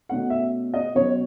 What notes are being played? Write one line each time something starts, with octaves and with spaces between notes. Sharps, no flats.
B2 A3 C#4 F#5
E5
D#5
B2 F#3 C#4 C#5